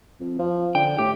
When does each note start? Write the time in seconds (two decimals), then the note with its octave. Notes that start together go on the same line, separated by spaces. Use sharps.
0.21 F2
0.39 F3
0.75 D3 G5
0.99 A2 G4